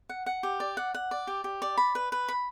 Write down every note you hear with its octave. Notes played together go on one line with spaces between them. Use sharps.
F#5
F#5
G4
D5
F#5
F#5
D5
G4
G4
D5
B5
B4
B4
B5